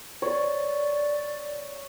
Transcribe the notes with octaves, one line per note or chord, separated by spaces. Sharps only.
C#5 D5